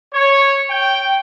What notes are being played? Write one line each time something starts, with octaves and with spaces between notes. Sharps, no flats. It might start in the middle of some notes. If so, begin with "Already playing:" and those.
C#5
G5